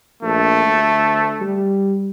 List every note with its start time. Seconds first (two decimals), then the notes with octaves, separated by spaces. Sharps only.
0.23 A#1 A3
0.66 D2
1.41 G3